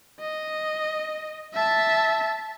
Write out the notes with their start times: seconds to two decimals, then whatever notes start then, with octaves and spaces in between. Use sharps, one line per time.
0.20 D#5
1.54 E5 A5